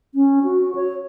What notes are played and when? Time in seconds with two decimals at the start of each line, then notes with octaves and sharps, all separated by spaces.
0.15 C#4
0.44 F#4
0.75 C#5